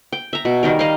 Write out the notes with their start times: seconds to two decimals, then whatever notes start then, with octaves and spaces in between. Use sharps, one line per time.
0.12 G5
0.33 E5 A#5
0.45 B2
0.63 D#3 G3 A#4
0.79 D#5 F5